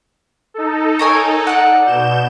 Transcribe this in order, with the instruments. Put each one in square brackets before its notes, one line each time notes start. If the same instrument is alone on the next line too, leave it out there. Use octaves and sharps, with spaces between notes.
[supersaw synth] D#4 A4
[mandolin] A#4 C#5 G#5
D5 F#5
[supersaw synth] B2 G6 E7